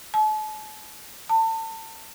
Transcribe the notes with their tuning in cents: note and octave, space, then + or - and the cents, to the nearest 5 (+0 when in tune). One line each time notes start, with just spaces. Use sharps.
A5 -40
A5 +35